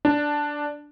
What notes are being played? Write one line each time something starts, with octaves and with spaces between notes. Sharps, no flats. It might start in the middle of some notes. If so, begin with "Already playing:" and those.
D4